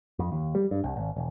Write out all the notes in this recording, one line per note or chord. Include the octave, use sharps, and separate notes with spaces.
F2
D#2
G3
G2
C2
G#1
E1